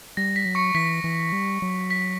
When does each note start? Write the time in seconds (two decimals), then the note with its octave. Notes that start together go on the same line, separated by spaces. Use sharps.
0.17 G3 A#6
0.36 B6
0.45 F#3
0.55 C#6 C#7
0.75 E3 B6
1.04 E3
1.32 G3
1.62 F#3
1.91 B6